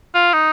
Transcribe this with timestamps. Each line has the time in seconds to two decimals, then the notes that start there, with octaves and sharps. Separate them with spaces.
0.14 F4
0.33 D#4